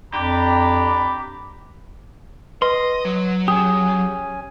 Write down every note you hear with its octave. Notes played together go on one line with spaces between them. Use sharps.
F2 D4 G4 A#5 B5
B4 D#5 C6
F#3
C#4 G4 G#4 G#5 D#6